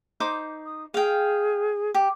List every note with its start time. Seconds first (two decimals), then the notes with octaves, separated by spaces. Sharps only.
0.20 D#4 C5 D6
0.65 D#6
0.94 G#4 F5 G5
1.94 G4